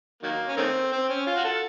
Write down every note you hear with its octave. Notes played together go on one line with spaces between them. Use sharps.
D#3 F#3 A#3
C#4
D#3 A3 C4
C4
C#4
F4
F#4
A4